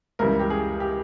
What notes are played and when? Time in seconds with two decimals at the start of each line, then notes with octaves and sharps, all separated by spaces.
0.19 C#2 C#3 E3 G3 A#4
0.40 G4
0.50 G#4
0.80 G4